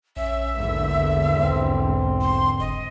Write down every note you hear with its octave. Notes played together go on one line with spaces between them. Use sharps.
A#1 C#4 E5
E2 G#2 D3 A#3
B1 C4
C6
F#1 D#5